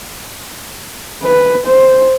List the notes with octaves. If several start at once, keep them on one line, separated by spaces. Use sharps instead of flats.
B4
C5